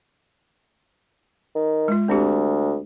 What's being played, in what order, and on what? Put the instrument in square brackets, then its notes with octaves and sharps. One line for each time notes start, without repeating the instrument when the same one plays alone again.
[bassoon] D#3
[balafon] G#3 F4
[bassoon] D2 [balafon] C4 D4 G4